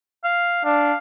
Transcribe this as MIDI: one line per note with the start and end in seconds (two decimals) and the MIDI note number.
0.24 0.60 77
0.65 0.92 62
0.65 0.98 77